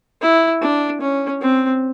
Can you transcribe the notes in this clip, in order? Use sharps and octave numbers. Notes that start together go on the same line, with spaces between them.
E4
D4
C#4
C4